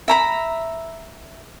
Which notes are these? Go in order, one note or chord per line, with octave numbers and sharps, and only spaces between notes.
E5 A#5 B5